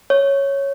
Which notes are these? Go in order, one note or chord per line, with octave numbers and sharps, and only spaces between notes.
C#5